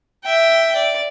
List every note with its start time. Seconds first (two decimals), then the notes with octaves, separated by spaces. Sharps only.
0.23 E5 G5
0.76 D5